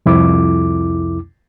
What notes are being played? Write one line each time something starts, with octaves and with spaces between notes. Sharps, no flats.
C2 F2 E4 D6